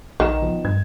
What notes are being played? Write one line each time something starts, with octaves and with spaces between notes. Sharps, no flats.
A#1 D#3 A#4 E7
F3 B3
G2 G#6